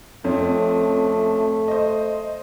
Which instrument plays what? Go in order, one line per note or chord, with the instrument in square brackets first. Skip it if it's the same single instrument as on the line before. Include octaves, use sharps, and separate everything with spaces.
[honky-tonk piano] F2 C4 C#4 [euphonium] A3
[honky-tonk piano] C5 D#5